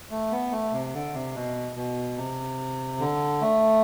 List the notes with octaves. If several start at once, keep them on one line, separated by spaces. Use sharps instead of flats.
A3
B3
A3
C3
D3
C3
B2
B2
C3
D3
A3